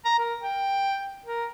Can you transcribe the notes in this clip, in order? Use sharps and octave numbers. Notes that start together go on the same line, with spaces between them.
A#5
A#4
G5
A#4